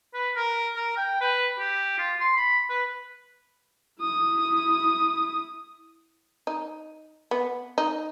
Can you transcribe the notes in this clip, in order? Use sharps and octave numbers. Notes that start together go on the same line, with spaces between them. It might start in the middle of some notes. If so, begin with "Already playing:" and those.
B4
A#4
A#4
G5
B4
G4
F4
C6
B5
B4
E4 D#6
D#4
B3
D#4